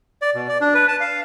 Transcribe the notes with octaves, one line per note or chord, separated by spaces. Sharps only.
D5
B2
D5
D4
B4
A5
F5